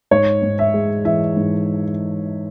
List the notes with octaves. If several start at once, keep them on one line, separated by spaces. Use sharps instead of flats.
G#2 C#5
G#2
E5
G#3
E3 E5
G#2